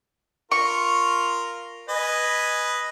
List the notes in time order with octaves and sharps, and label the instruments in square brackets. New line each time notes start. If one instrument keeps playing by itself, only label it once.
[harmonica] F4 A#4 [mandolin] C#6
[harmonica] B4 D#5 G#5